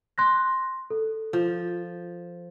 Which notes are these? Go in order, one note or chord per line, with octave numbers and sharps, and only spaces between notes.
C6 F#6 A#6
A4
F3